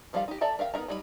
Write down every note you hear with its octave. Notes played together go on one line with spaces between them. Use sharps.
D#3 F3 G3 D#4 F5
D#4 G4
A4 D5 E5 A5 A#5
A#4 E5 F5 G5
B3 D#4 A#4 E5 A#5
F#3 G3 D#4 A#4 B5